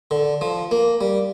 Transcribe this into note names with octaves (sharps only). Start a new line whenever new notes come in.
D3
F3
A#3
G3